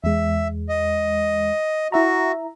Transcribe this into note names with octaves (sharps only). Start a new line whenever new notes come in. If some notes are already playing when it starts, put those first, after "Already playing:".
E2 G#3 E5
D#5
E4 F#4 E5 A#5